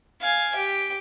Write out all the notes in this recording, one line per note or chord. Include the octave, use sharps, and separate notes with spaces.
F5 G#5
G4